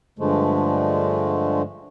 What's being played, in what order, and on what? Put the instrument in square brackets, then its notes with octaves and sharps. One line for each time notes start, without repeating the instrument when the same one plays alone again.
[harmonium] G2 D3 F3 G#3 A3